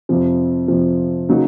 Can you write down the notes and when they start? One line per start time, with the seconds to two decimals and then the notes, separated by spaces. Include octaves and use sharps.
0.09 F2 C3 F3
0.68 F2 C3 F3
1.29 C#3 F#3 A#3 D#4